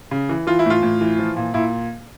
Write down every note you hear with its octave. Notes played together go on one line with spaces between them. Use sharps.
C#3
E3
E3 F4
E4
A2 F4
A2
E3
F3
A#2
A#2 E4